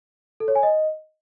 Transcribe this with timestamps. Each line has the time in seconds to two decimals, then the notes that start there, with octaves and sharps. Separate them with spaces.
0.40 A4
0.48 C#5
0.55 G#5
0.63 D#5